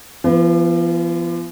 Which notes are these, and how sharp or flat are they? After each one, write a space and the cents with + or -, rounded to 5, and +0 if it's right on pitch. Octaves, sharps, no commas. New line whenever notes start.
F3 -40 B3 +0 B4 +0